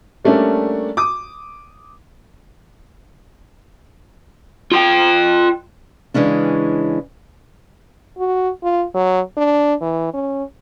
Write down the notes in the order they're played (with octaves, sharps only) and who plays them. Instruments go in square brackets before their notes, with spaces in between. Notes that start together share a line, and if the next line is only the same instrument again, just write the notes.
[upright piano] G3 A3 A#3 C#4 D4
D6 D#6
[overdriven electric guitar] F4 G5
[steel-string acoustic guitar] C#3 E3 G#3 C#4 D4
[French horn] F#4
F4
F#3
D4
E3
C#4